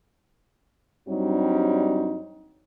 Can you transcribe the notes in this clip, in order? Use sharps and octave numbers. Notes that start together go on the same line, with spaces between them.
G2 F#3 G3 C4 D4 D#4